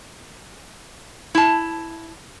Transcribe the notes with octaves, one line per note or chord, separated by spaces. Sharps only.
E4 A5